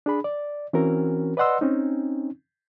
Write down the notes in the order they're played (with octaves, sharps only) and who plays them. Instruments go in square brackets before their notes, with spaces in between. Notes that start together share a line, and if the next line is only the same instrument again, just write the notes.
[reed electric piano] D4 G#4 B5
D5
E3 C4 C#4 F#4 A#4
B4 D5 D#5 F#5 C6 E6
C4 C#4 D#4